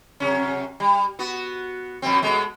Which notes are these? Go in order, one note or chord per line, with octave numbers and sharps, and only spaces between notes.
F#2 C3 C#4
G3
B3 F#4
F2 B2 C4
B2 G#3 A3